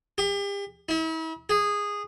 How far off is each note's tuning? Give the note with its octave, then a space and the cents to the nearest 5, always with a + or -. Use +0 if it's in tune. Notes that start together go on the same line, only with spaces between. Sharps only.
G4 +40
E4 -40
G#4 -15